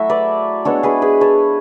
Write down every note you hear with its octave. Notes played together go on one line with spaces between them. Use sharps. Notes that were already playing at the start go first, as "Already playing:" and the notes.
Already playing: F#3 A3 E4 F#4 A4 E5
B4 D5
G#3 B3 D4 A4 C#5
G#4 B4
G#4 B4
A4 C#5